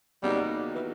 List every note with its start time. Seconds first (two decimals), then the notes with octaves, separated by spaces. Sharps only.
0.23 E2 C#3 F#3 G3 A#3 D#4
0.75 E3